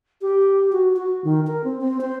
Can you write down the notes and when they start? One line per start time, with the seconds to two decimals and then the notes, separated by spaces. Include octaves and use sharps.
0.22 G4
0.72 F#4
0.96 F#4
1.24 D#3
1.47 A#4
1.64 C4
1.81 C4
2.01 C5